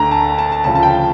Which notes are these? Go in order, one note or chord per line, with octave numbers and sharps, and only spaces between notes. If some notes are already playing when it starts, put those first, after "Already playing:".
Already playing: D2 D3 A3 A#5
A5
A5
A5
D2 C#3 F3 A5
A5
G5